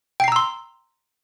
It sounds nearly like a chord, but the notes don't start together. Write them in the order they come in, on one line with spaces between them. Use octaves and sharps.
G5 C7 A#5 E6 C6